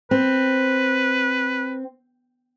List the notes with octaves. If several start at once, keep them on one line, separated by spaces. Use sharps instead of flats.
C4 B4